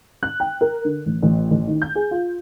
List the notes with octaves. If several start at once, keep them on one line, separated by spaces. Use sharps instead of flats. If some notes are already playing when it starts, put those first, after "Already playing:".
F#6
G5
A#4
D3
A1
A1
A1
D#3
G6
G#4
F4